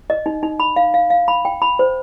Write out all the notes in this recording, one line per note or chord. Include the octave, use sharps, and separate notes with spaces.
D#5
D#4
D#4
B5
F5
F5
F5
B5
G5
B5
C5